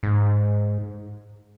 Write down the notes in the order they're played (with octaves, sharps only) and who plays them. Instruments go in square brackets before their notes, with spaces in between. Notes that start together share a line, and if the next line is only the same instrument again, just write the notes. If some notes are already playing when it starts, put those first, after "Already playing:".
[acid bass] G#2